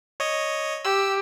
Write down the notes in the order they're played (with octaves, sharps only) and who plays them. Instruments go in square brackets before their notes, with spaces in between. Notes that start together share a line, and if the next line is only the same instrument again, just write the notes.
[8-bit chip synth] C#5 D#5
[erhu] G4 [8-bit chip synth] E6